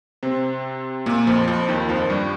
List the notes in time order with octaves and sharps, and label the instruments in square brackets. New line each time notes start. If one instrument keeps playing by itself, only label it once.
[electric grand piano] C3 C4
A#2 A#3
F2 F3
F2 F3
D#2 D#3
F2 F3
G2 G3